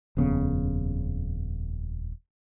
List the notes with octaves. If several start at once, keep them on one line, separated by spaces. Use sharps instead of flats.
D#1 F2 C#3 B3